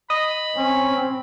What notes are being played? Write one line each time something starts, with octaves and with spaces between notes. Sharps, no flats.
D#5 B5
C4 C#4